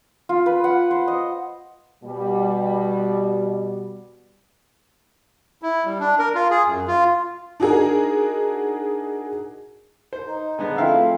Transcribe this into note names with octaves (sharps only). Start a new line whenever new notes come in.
F4
B4
F#5
C5
D#5
B2 G3
E4
G3
D4
A#4
F4
G#4
F#2
F4
D4 D#4 F#4 G#4 A#4
C5
D#4
D3 G#3 B3
F3 A3 C4 E4 F5 E6